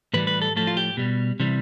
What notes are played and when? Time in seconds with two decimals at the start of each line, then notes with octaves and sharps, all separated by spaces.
0.13 A2 E3 G3 B4
0.27 B4
0.42 A4
0.56 A2 F3 A3 A4
0.67 F4
0.77 G4
0.97 B2 G3
1.40 C3 E3 G3